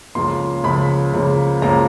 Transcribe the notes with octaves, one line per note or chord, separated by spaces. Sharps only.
C#2 C#3 F3 A#3 C6
C#2 C#3 F3 A#3 B5
C#2 C#3 F3 A#3
C#2 C#3 F3 A#3 A#5